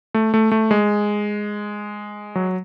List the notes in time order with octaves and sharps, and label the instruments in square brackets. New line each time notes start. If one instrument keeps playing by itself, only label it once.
[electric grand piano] A3
A3
A3
G#3
F#3